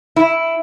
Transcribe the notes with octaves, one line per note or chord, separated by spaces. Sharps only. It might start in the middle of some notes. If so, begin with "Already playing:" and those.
E4